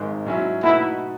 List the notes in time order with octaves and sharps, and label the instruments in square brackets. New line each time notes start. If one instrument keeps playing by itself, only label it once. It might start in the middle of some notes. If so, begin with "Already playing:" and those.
Already playing: [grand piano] G#1 G#2 D#3 G#3
G#2 F#3 C#4 E4
[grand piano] B2 A3 D#4 F#4 A4 [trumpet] E4